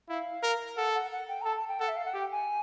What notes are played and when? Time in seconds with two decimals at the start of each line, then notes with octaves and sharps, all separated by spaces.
0.09 E4 F5
0.43 A#4
0.77 A4 F#5
0.95 F#5
1.12 F#5
1.28 G5
1.42 A#5
1.45 A4 A5
1.57 A5
1.68 G5
1.80 A4 F#5
1.88 E5
1.96 F5
2.05 F#5
2.14 G4 G5
2.31 G#5